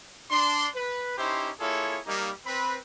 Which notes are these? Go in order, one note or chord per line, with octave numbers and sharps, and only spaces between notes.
D4 C6
B4
C#4 D#4 E4 G4 C5
A#3 E4 F4 G#4 A4 C#5
G3 A#3 D#4
C4 B4 B5